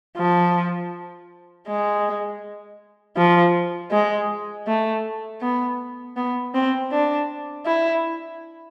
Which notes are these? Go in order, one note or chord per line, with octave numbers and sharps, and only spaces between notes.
F3
G#3
F3
G#3
A3
B3
B3
C4
D4
E4